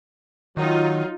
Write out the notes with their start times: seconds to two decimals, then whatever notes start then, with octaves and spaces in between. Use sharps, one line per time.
0.57 D#3 F#3 D#4 F4